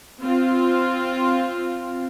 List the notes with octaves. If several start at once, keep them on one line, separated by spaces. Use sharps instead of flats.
C4 F4